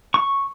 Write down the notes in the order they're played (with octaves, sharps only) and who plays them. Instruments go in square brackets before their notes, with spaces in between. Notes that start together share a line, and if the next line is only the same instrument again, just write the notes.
[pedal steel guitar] C#6